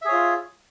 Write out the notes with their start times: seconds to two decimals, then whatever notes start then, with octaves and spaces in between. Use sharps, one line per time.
0.02 E5
0.05 G#4
0.09 C#5
0.12 F4